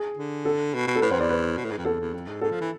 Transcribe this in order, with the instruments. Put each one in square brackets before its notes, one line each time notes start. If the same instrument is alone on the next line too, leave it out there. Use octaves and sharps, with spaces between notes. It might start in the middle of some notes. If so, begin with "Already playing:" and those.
Already playing: [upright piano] G#4
[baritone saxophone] D3
[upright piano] A4
[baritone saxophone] B2
B2
[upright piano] A4
[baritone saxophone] A2 [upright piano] B4
[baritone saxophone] F2 [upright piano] C5
[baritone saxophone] E2 [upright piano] D5
[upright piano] B4
[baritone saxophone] B2
A2
G#2
F2
[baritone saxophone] E2 [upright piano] A4
[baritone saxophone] E2
F2
G#2
[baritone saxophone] G#2 [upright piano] A4
[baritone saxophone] F3
E3